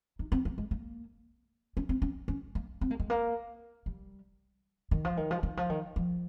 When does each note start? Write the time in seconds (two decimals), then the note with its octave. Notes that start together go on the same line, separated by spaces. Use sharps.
0.19 D#4
0.32 C4
0.45 A#3
0.58 G#3
0.71 A#3
1.77 C#4
1.89 C4
2.02 C#4
2.28 C#4
2.55 A#3
2.81 C4
2.91 A#3
3.00 G#3
3.10 A#3
3.86 G3
4.91 D#3
5.05 F3
5.17 D#3
5.31 F3
5.43 D#3
5.57 F3
5.70 D#3
5.96 F3